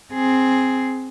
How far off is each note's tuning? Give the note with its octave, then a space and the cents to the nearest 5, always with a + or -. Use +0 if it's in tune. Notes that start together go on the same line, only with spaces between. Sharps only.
C4 +0 G#4 +5